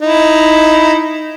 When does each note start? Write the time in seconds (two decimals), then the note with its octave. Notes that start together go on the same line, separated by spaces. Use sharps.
0.02 D#4 E4